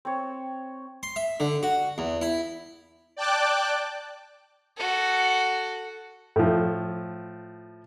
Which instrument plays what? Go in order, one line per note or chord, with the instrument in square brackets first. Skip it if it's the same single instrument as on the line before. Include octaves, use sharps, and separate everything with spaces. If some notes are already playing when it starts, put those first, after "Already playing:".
[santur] C4 C#5
[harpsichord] C6
E5
D3
F#4
E2
E4
[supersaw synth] D5 G5 A5 D6 F#6
[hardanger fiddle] F#4 A4
[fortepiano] A2 F3